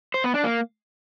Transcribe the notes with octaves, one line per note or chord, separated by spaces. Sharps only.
C5
B3
D4
A#3